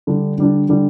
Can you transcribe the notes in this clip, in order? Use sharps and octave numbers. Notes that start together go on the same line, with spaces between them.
D3 G3 D4
D3 G3 D4
D3 G3 D4